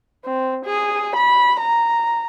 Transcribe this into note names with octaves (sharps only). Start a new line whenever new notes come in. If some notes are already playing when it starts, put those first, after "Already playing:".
C4
G#4
B5
A#5